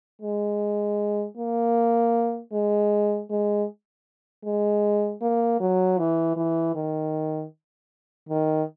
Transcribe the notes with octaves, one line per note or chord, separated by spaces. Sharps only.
G#3
A#3
G#3
G#3
G#3
A#3
F#3
E3
E3
D#3
D#3